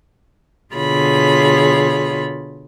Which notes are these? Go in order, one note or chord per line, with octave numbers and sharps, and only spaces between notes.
B2 D3 F4 G#4 C#5 B5